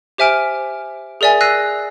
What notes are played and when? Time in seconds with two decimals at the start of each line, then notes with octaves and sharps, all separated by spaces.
0.18 G4 C5 E5 G#5 F6 D7
1.21 G#4 A#4 D5 E5 G#5
1.41 E6 F#6 A#6 C7 D#7